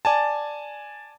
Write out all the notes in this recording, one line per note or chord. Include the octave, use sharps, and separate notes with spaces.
D5 G#5 A5